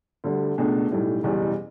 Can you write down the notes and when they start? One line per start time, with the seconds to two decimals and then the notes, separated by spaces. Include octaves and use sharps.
0.24 D2 D3 G3
0.58 C#2 B2 A3 D4
0.91 B1 A2 G3
1.23 F#1 E2 B2 G3